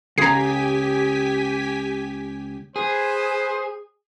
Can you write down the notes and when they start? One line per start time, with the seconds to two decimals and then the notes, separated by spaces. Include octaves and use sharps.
0.18 C#2 G4 G#4 G#5 A#5 B6 C7
2.76 G#4 B4 C5